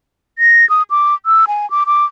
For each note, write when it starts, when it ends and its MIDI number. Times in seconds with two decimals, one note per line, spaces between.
0.39 0.68 94
0.70 0.83 87
0.90 1.14 86
1.26 1.45 88
1.48 1.69 80
1.70 1.84 86
1.86 2.05 86